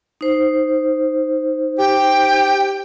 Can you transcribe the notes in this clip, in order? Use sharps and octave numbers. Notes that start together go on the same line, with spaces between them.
D#4 C5
G4 G5